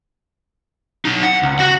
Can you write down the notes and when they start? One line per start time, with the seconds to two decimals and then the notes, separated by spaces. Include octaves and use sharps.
1.05 B1 D#4
1.23 F#5
1.43 C#2
1.59 F#4 F#5